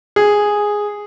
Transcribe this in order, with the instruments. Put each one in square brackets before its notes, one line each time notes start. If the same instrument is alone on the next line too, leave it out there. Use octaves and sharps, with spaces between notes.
[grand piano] G#4